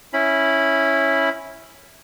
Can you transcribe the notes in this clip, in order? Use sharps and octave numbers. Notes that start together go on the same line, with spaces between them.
C#4 E4 B5